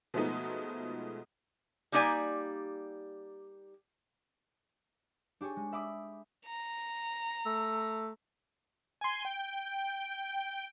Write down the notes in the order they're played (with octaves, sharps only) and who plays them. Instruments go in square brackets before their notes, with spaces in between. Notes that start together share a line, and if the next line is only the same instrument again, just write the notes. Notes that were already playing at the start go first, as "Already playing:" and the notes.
[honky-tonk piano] B2 F3 G#3 A3 B3 D#4
[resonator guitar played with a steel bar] G3 A#3 D#4 G4 D5 G#5
[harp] D4 G4 G#4 C#5
G#3
E5 B5 D6 D#6
[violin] A#5
[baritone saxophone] A3
[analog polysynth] G#5 C6
G5